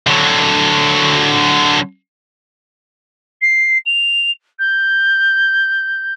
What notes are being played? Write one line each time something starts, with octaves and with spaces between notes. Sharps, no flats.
D3 F#3
C7
F7
G6